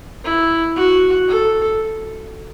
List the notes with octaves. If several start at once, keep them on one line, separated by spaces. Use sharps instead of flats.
E4
F#4
A4